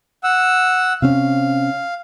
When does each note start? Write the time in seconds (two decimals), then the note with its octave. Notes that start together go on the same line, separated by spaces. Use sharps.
0.23 F#5 E6
1.02 C3 C4 C#4 F5